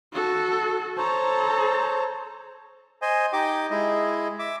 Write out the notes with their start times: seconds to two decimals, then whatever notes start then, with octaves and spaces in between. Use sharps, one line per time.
0.13 F#4 A4
0.97 A4 C5 C#5 A5 A#5
3.02 C5 D#5 G#5
3.33 D#4 G4 D#5 G5 D6
3.71 G#3 E4 D#5
4.39 E5 D6